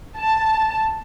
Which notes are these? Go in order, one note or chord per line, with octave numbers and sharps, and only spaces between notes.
A5